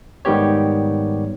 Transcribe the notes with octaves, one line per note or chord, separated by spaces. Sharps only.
G#2 D#3 G3 B3 G4 C#5